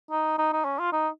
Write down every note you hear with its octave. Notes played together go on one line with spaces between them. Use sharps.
D#4
D#4
D#4
C#4
F4
D#4